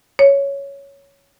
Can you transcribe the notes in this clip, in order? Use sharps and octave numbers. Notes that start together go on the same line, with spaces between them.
C#5